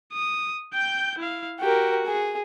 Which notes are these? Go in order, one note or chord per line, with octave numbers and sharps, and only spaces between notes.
D#6
G5 G6
E4 F5
F#4 G4 A#4
G#4